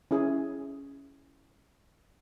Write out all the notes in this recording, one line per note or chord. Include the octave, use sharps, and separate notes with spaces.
C#4 E4 G#4